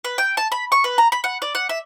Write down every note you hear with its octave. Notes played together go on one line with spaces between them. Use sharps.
B4
G5
A5
B5
C#6
B4
A#5
B5
F#5
D5
F#5
E5